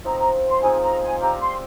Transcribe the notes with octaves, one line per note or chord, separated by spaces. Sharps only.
F3 C4 D#4 A#5
A#5
C6
F3 G#3 C4 D#4 G#5
A#5
G#5
C4 G4 D5 F5 A#5
C6